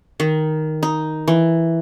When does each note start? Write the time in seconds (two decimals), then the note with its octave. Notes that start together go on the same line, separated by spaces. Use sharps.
0.20 D#3
0.83 D#4
1.28 E3